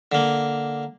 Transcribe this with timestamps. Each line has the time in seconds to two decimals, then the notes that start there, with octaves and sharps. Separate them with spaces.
0.12 D3 A#3